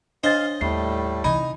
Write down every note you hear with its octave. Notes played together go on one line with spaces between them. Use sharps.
D4 C5 C#5 D#5 F5 G#5 A6
D#2 A2 G3 A3 C7
C3 E3 D#4 G#5 B5